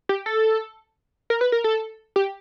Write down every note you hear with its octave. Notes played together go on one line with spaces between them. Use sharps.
G4
A4
A#4
B4
A#4
A4
G4